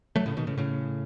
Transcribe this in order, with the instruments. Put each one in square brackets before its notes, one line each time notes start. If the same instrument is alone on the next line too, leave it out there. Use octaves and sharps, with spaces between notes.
[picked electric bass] F#3 A3
A2 C#3
B2 D#3
A2 C#3
A2 C#3